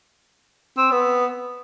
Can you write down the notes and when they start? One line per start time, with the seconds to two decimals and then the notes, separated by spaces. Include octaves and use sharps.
0.78 C4
0.92 B3